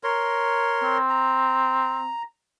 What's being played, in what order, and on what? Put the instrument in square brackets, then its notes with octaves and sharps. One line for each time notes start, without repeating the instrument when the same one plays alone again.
[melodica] A#4 C#5 C6
[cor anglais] C4
[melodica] A#5